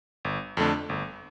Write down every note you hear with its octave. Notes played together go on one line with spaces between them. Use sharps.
G1
F2 D3 A3 D4
G1